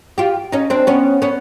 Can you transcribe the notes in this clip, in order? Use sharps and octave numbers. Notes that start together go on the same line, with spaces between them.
F4 G4
C#4 D#4
C4 D4
B3 C#4
B3 C#4